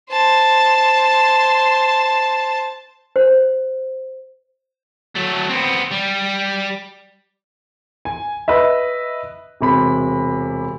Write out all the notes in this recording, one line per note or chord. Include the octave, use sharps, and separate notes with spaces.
C5 A5
C5
F#3 A3
B3 C4
G3
G#5
B4 D#5 E5
E1 C3 B5